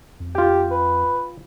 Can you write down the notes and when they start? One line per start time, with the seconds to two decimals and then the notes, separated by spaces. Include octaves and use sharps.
0.20 F2
0.35 F4 G4 G5
0.71 B4